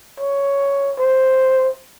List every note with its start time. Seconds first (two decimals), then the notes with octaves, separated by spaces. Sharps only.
0.20 C#5
0.99 C5